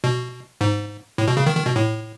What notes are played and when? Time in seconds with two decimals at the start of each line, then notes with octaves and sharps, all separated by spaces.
0.04 B2
0.61 G#2
1.18 A2
1.28 B2
1.37 C#3
1.46 D#3
1.57 D#3
1.66 B2
1.76 A2